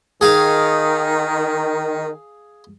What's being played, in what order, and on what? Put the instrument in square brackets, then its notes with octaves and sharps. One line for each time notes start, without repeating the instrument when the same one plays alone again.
[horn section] D#3 [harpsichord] G#4 F5